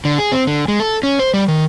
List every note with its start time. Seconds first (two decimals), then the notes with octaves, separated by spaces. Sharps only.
0.05 D3
0.19 G#4
0.32 C4
0.47 D3
0.68 G#3
0.80 A4
1.03 C#4
1.19 C5
1.34 G3
1.48 D#3